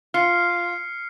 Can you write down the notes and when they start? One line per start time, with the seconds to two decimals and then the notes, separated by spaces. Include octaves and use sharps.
0.14 F4 F6 C7 C#7